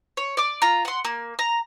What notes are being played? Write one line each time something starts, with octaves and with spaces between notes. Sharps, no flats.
C#5
D5 D6
F4 A#5
F#5 C6
A#3
A#5